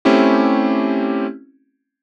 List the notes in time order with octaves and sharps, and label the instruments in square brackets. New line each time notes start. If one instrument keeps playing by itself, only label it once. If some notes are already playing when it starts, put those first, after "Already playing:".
[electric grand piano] A3 C4 C#4 E4 G4